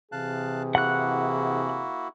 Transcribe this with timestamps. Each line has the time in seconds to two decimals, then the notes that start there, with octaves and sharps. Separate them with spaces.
0.12 C3 E3 G#4 F5 A5 F#6
0.75 A#3 E4 F#4 F#5 F#6